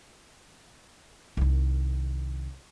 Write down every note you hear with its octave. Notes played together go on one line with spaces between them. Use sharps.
C2 D#3